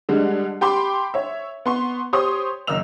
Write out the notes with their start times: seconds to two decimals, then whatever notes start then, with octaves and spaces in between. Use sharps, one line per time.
0.09 D3 G3 G#3
0.61 G4 G5 B5 C6 D6
1.14 C#5 E5
1.66 B3 C6 C#6
2.13 G4 C5 C#5 C6 C#6 D#6
2.67 F#1 A#4 D#5 E6 F7